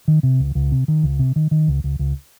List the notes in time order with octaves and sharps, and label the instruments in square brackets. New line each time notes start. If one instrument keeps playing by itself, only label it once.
[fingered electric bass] D#3
C3
C#2
C#2
C3
D#3
C#2
C3
D#3
D#3
C#2
C#2
C#2